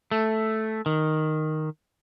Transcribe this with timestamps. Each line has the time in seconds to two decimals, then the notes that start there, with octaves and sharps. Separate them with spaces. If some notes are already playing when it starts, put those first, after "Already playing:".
0.11 A3
0.86 D#3